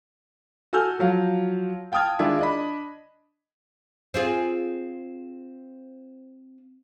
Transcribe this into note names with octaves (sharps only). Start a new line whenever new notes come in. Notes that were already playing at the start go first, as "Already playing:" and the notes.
F#4 A4 G#5 E6 F6 G6
F3 F#3 F5
F5 G5 A5 D#6 F6 G#6
D#3 G#3 D4 E4 F4
D4 D#5 B5
C4 F4 G#4